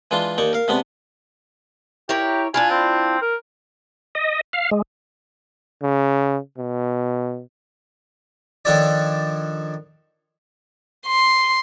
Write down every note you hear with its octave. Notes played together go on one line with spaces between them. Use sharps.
E3 G#3 D4 F4
D#2 D#4 D5 C#6
A#4 F5
C3 G#3 B3 D4
E4 G4 A#4 C#5
D4 E4 F4 G#5
C4
A#4
D#5
F5
G#3
C#3
B2
D#3 F3 D4 A4 C#5 D5
C6